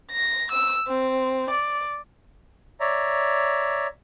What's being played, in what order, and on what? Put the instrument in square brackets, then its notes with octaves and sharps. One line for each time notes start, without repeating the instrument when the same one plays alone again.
[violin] A#6
E6
C4
D5
[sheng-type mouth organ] C#5 D5 E5 A#5